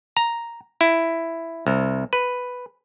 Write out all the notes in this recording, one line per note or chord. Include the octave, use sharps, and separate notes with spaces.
A#5
E4
C2
B4